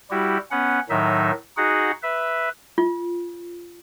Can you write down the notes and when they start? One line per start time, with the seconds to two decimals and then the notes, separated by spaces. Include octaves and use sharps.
0.11 G3 E4 F#4 G4
0.51 B3 C#4 F#5
0.89 A2 D#3 F#3 D#4 E5
1.57 D#4 F#4 G#4 F#5
2.03 B4 E5
2.78 F4